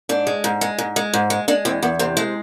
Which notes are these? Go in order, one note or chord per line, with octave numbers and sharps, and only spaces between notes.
G#2 D4
G#3
G#2
G#3
G#2
G#3
G#2
G#3
G#3 D4
E2 C4
E2 B3
C3 C4
G#3 A3